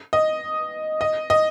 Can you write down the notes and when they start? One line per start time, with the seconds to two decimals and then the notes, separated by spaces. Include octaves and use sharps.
0.13 D#5
1.01 D#5
1.30 D#5